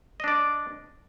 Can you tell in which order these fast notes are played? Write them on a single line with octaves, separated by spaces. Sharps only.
D#5 D4 D5